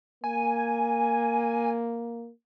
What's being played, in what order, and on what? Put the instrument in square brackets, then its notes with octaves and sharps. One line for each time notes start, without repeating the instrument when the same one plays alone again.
[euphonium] A#3 [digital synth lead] G#5